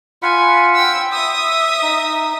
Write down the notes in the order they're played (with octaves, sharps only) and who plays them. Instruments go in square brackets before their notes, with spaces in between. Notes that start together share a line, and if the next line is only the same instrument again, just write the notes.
[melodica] F4 F#5 B5 [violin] G#5
[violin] G5 E6
[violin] E5 D#6 [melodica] E6
[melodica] D#4